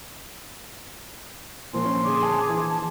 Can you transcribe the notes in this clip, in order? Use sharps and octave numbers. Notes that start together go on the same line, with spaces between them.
A#2 F3 C6
C#4
D3 G#4 D6
G#5 A5
E3
A5